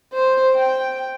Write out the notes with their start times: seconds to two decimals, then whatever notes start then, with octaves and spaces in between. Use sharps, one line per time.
0.14 C5
0.55 G5